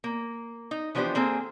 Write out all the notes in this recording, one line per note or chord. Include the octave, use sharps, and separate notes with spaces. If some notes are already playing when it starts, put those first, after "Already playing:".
A#3
D#4
E3 F3 B3 D4 G4 C5
A#3 C4 G#4 A4